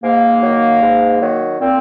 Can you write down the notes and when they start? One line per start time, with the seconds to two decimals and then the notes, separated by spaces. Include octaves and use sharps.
0.03 G#2 A#3
0.42 D#3 F#3
0.82 G#2
1.21 D#3 F#3
1.61 A#2 C4